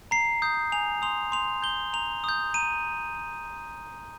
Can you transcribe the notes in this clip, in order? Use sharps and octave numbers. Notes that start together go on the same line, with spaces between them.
A#5 C7
D#6 G6
G#5 F7
C6 D#6 F7
C6 F7
G6 G7
A#5 F7
D#6 G6
A#5 D#7